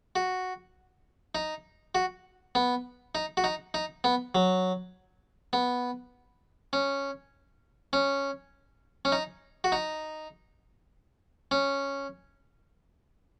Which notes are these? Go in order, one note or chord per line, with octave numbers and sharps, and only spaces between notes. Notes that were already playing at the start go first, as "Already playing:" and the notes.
F#4
D#4
F#4
B3
D#4
F#4
D#4
D#4
B3
F#3
B3
C#4
C#4
C#4
D#4
F#4
D#4
C#4